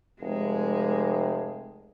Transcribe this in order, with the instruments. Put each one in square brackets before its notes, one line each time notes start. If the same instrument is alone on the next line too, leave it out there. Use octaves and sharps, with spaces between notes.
[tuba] F1 [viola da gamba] G#3